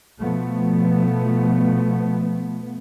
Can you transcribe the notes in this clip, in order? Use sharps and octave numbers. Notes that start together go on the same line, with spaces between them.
B2 F3 A3 B3